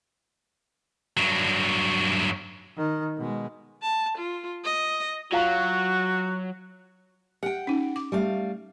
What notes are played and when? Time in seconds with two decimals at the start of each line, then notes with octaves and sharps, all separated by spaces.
1.17 G2 F#3
2.77 D#3
3.17 B2 G#3
3.82 A5
4.18 F4
4.64 D#5
5.32 F#3 F4 F#4 F5 A#5
7.43 G4 F#5 G5
7.67 C#4 D#4
7.96 D6
8.12 G3 A3 F5